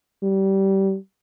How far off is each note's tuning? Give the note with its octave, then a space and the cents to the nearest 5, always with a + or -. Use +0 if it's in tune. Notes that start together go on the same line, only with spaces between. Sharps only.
G3 -20